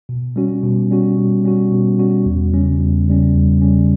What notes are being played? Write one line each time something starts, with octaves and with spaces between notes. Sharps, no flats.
B2
G3 C#4 F#4
B2
G3 C#4 F#4
B2
G3 C#4 F#4
B2
G3 C#4 F#4
E2
C#3 G3 C#4
E2
C#3 G3 C#4
E2
C#3 G3 C#4